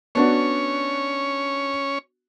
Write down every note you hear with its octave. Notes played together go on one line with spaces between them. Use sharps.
B3 C#4 D4 F#4 C#5